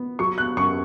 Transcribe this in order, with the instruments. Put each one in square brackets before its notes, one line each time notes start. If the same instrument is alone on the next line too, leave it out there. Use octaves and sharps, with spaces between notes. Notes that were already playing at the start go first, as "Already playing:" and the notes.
Already playing: [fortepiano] B3
[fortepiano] F#3 [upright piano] C#6
[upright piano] F#6
[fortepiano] F#2 [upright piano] C#6